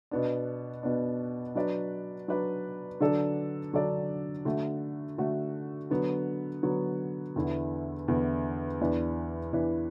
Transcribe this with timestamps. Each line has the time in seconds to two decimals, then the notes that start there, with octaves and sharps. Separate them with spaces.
0.11 B2 B3 D4
0.83 B2 B3 D4
1.55 F#3 D4 B4 D5
2.28 F#3 D4 B4 D5
3.00 D3 F#3 D4 A4 D5
3.73 D3 F#3 D4 A4 D5
4.45 D3 A3 F#4
5.18 D3 A3 F#4
5.91 D3 F#3 B3
6.63 D3 F#3 B3
7.36 E2 D3 B3 E4
8.08 E2 D3 B3 E4
8.81 E2 E3 D4 B4 D5
9.53 E2 E3 D4 B4 D5